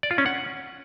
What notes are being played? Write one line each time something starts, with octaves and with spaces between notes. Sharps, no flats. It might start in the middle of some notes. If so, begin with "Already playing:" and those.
D5
F4
C#4
F#5